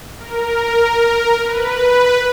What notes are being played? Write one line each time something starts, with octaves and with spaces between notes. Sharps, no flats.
A#4
B4